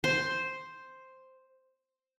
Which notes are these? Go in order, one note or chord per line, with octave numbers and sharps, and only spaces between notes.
C5 C6